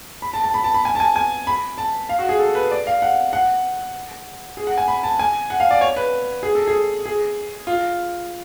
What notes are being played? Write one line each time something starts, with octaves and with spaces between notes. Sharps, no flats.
B5
A5
A5
B5
A5
B5
G#5
A5
G#5
G#5
B5
A5
F5
F#4
G#4
A4
B4
D5
F5
F#5
F#5
G#4
F#5
G#5
B5
A5
G#5
F#5
F5
D5
C#5
B4
G#4
A4
G#4
G#4
F4